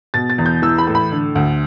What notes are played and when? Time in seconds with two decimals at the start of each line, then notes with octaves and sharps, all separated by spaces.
0.14 B2 A6
0.30 A6
0.38 E2
0.46 G6
0.62 E3 E6
0.78 B5
0.87 A2
0.95 B5
1.11 D3
1.35 D2